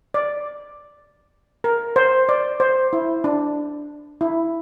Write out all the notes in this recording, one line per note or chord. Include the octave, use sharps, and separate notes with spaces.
D5
A#4
C5
D5
C5
E4
D4
E4